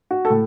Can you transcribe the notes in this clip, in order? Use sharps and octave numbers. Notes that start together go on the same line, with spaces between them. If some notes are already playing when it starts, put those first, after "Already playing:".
F#4
A4
A2